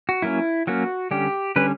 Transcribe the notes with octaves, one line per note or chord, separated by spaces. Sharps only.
F#4
F#3 A#3 C#4 E4
F#3 A#3 C#4 F#4
D3 G3 C#4 G4
D3 G3 C#4 B4